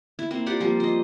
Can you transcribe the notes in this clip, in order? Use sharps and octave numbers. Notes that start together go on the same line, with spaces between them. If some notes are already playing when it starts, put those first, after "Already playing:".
E4
A#3 C4 E4
F4 G4 D5 F#5
F3 G3 A#3
C5 D#5